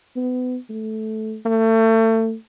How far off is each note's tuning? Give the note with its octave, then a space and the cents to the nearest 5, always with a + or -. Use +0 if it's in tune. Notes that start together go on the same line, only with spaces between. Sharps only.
B3 +30
A3 -10
A3 +30